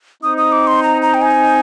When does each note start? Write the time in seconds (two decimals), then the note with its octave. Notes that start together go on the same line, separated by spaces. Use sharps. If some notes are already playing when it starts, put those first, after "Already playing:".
0.23 C4 D#4 D#6
0.37 D#6
0.52 D6
0.67 C6
0.83 A#5
1.02 A#5
1.14 G5
1.22 G#5